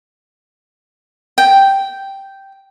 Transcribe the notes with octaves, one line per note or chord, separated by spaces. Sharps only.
G5